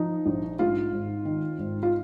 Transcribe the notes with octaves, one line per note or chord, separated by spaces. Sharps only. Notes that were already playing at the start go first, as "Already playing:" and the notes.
Already playing: F3 D#4
A#1
G#2 F4
G#1
D#3
G#1
F4